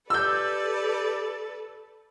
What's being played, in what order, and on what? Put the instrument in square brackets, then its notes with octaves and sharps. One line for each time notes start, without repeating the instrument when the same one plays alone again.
[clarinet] G4 [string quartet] A4 B4 D5 [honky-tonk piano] E6 G6